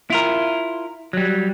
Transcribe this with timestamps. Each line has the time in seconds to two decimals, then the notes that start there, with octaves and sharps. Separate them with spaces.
0.10 E4 F4 A#4
1.13 F#3 G3